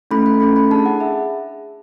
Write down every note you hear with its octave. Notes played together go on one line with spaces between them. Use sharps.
A3 C#4 E4 A4 B5
B5
A3 C#4 E4 A4 B5
B5
D4 G#4 A5
F#5
G#4 E5